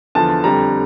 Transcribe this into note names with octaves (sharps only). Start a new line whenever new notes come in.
E2 D3 F3 A5
F2 D3 G3 A#5